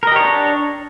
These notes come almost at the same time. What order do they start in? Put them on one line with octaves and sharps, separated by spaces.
A#4 D#5 G4 C#5 D4